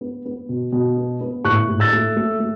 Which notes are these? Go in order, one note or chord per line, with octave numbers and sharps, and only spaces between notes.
B3
B3
B2
B2
B3
B3
A2 C#6 F#6
A2
E6 A6
A3
A3
A3